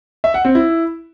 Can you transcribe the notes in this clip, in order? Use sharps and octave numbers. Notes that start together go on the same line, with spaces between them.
E5
F#5
C4
E4